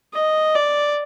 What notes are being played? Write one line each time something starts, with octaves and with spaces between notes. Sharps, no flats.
D#5
D5